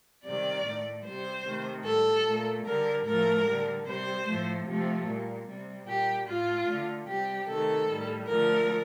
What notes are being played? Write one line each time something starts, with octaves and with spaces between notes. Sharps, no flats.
C3 D#3 G3 D5
A2 A3
C3 G3 C5
C3 D#3 A3
A2 G3 A4
A#2 A3
D3 G3 A#4
A2 F3 A3 A#4
D3 G3
C3 G3 C5
A2 F3 A3
C3 F3 A3
A#2 G3
C3 G3
A#2 G3 G4
A2 A3 F4
D3 A3
C3 G3 G4
C3 D#3 A3 A4
A2 G3
D3 F3 A3 A#4